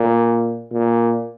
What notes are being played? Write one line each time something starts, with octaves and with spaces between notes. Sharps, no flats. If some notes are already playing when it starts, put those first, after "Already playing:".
Already playing: A#2
A#2